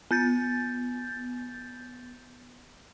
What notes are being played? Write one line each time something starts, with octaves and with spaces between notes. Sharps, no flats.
B3 G6 A6